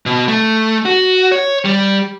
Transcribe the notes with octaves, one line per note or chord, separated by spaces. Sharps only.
B2
A3
F#4
C#5
G3